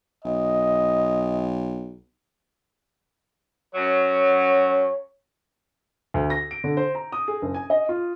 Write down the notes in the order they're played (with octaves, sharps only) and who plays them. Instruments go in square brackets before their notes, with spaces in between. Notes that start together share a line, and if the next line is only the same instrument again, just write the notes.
[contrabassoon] B1 [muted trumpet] D#5
[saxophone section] F#2 F#3 [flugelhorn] C#5
[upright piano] D2
A#6
D7
D3
C5
A#5
D#6
G#4
F#1
G#5
D#5
F4